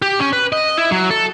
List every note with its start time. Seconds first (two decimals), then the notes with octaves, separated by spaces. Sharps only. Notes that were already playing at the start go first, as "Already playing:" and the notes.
0.02 G4
0.20 C#4
0.33 B4
0.52 D#5
0.77 E4
0.91 F#3
1.10 A4